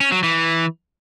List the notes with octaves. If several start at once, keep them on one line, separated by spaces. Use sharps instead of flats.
C#4
F#3
E3